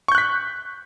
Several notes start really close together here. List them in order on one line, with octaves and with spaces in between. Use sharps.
C#6 G6 F#6 B6